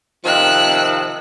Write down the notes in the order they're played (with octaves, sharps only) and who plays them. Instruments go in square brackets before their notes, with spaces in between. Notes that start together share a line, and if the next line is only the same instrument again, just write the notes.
[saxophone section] C3 D#3 F3 [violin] E6 F#6